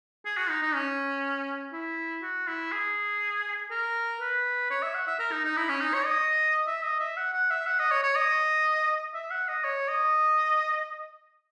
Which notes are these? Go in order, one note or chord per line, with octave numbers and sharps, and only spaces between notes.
G#4
F#4
D#4
D#4
C#4
E4
F#4
E4
G#4
A#4
B4
C#5
E5
F#5
E5
A#4
D#4
D#4
E4
C#4
D#4
C#5
D#5
E5
D#5
E5
F#5
F#5
E5
F#5
D#5
C#5
C#5
D#5
E5
F#5
D#5
C#5
D#5